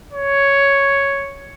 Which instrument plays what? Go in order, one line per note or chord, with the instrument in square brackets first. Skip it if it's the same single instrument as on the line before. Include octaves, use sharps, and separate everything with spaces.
[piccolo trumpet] C#5